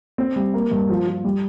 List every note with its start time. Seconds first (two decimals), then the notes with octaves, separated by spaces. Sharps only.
0.18 C4
0.36 G3
0.54 A#3
0.71 G2
0.89 F3
1.07 F3
1.24 G3